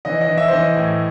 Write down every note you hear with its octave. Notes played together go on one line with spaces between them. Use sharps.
E3 D#5
D#5
E3
E5
C5
E3 D#5
A2